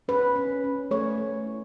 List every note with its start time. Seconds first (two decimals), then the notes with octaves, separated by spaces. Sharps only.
0.08 C#4 B4
0.36 C#4
0.64 C#4
0.91 A3 C#5
1.18 A3
1.46 E4